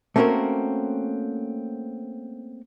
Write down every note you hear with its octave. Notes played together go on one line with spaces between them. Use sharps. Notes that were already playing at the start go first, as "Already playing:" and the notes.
A3 A#3 C4 C#4 F#4 A#4